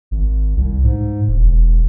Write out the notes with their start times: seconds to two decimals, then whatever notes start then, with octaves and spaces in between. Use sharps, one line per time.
0.11 G#1
0.57 C2
0.84 G#2
1.28 E1
1.43 E1